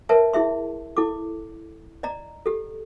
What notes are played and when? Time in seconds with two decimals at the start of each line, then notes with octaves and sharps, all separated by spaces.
0.09 A#4 B4 C#5 E5 A5
0.33 E4 G#4 E5 C6
0.97 E4 A4 D6
2.03 D5 D#5 A#5
2.46 G4 A4